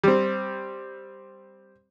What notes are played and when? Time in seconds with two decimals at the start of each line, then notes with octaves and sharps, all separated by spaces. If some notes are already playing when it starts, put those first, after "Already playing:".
0.03 G3 C4